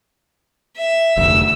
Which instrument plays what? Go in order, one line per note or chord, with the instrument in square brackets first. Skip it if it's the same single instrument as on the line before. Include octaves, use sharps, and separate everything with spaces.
[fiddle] E5
[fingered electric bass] F1 D2 [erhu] E6